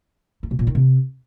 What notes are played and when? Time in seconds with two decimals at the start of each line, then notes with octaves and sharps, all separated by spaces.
0.43 A3
0.51 B2
0.59 A#2
0.67 D#3
0.75 C3